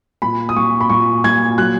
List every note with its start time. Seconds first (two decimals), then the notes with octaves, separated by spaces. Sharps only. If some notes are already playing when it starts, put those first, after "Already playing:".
0.22 A#2 B5
0.49 D#6
0.56 A#2 C#6
0.81 B5
0.90 A#2 C#6
1.24 A#2 G#6
1.58 F#3 F#6